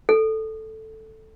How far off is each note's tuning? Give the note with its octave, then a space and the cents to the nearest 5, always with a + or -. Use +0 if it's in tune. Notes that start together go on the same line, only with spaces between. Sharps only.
A4 +0